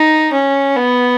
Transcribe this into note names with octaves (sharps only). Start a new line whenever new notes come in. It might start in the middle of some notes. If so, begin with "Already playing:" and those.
Already playing: D#4
C#4
B3